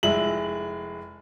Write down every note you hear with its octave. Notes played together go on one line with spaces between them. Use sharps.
F1 G#3 E4 F#7